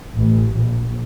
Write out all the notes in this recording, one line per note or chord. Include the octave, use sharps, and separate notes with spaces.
A1
A#1